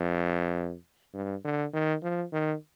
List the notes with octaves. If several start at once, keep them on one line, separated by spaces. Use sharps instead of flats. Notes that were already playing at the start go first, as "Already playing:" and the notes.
Already playing: F2
G2
D3
D#3
F3
D#3